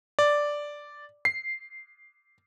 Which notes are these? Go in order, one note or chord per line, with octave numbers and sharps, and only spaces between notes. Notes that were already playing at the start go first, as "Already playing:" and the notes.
D5
C7